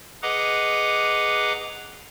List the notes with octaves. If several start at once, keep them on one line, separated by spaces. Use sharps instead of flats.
G#4 B4 D#5 F#5 A#5 D6